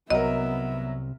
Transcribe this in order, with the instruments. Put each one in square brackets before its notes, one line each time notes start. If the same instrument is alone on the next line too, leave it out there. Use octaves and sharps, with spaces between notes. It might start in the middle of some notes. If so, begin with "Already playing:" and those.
[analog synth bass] C2 [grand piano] F#3 A#4 [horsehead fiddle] B3 E5 [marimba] D#5